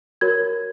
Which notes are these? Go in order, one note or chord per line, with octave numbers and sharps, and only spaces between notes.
F#4 A#4 C#5 G#6